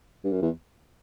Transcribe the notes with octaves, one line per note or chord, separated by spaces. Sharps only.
G2
F#2
E2